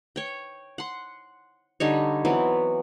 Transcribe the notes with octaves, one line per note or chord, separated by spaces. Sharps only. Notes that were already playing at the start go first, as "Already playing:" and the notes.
C#5 G5
F#5 C6
D3 G3 D#4 C#5
E3 F#3 B3 C4